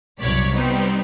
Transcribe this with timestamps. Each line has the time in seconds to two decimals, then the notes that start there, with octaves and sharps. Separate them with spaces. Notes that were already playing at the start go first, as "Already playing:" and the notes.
0.19 C2 F#2 B2 C#5 D5 B6
0.54 G3 B3 C4 D#4